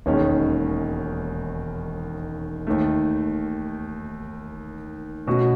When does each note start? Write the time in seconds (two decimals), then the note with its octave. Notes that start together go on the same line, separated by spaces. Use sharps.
0.06 E1 D#2 D#3 G#3 C#4
2.67 D#2 D#3 A3
5.27 B2 A3 C#4 F#4